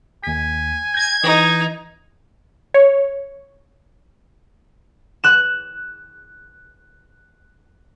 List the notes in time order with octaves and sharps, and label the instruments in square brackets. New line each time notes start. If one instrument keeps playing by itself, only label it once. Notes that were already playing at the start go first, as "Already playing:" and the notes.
[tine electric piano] D#2 B6 [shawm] G#5
[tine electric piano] G6 A#6 [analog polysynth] G#6
[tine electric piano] E3 [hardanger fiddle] D#4 [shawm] D#5
[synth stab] C#5
[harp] F#6 E7